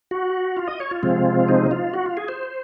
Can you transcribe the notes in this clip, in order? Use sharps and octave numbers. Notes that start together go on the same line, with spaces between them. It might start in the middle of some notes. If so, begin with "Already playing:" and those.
F#4
F4
D#5
C#5
F4
C3 F3 G#3 C4
D#4
F4
F#4
F4
G#4
C5